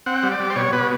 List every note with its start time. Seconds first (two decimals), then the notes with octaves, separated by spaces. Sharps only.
0.06 C4 F#5
0.23 G3
0.32 D5
0.40 G3
0.50 C5
0.56 B2 C#5
0.73 B2 B4